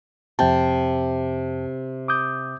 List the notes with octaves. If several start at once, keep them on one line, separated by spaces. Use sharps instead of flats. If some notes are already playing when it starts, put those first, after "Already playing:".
F2 C3 G5 A5
D6 D#6 G6